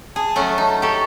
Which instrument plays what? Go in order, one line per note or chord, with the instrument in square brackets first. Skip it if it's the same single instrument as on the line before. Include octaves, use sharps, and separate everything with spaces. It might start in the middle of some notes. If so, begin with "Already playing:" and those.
[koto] G#4 [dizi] A5
[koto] F#3 A3 C#4
D#4
[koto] G4 A4 [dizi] C#6